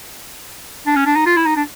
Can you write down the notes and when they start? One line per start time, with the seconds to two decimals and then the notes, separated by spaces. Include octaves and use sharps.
0.86 D4
0.96 C#4
1.06 D4
1.16 D#4
1.26 F4
1.37 E4
1.46 D#4
1.56 D4